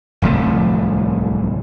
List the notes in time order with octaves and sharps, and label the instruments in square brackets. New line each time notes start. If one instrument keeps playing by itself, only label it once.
[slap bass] D1 C2 F3 A3